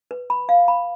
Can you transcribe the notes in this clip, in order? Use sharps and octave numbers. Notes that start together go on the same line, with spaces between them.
B4
B5
F5
B5